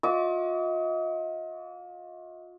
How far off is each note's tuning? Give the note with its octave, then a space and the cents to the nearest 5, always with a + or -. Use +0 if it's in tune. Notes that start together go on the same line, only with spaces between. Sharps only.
F4 +35 D#5 +35 D6 -40